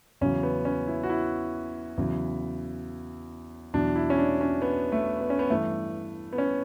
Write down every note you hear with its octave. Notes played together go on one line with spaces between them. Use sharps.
E2 C#3 F#3 C#4
B3
C#4
E4
F#4
E4
E2 C#3 F#3
E2 B2 F#3 D4
E4
C#4
D4
C#4
B3
A3
B3
C#4
B3
G2 E3 A3
B3
C#4